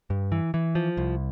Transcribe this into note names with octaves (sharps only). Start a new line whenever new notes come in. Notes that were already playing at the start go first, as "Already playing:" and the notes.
G2
E3
E3
F3
C2